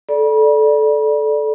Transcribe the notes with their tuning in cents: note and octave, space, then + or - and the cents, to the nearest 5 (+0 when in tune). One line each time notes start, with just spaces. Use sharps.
A4 -15 D5 +0 B5 -40